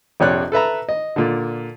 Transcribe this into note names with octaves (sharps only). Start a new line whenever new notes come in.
A#1 F2 C3 C#5 D5 F#6
A4 B4 E5 A#5
D#5
A#2 D3